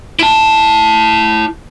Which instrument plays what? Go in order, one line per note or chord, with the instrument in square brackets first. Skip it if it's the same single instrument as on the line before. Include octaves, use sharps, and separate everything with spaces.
[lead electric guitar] E4 A5